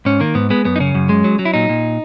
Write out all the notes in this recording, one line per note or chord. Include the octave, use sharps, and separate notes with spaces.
G#2 C#4
D#3 A#3
G#2 B3
G#3 B3
F#2 B3
D#4
C#3 C#4
F#2
G#3
F#3
F#3
E4
A#2 D#4
A#2